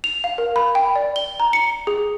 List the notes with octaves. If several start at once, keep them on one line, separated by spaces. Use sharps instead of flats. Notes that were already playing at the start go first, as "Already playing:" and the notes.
F7
F5
A#4
B5
G5
D5
G7
A#5
C#7
G#4